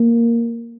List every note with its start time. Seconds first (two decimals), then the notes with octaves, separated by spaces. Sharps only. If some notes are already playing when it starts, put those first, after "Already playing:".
Already playing: A#3